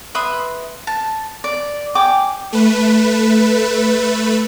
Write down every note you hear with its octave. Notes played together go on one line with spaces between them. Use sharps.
B4 E5 C6 D#6
A5
D5
G#4 G5 D6
A3 B4